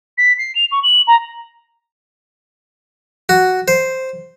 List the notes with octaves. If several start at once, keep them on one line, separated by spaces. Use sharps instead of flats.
B6
C7
F7
C#6
F#7
A#5
F#4
C5